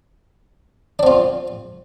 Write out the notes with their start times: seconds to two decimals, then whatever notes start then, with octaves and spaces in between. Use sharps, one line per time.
0.99 D4
1.03 C4
1.06 F4